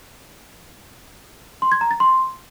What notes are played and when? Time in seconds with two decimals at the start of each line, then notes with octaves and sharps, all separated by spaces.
1.62 C6
1.72 G#6
1.81 A#5
1.91 A6
2.00 C6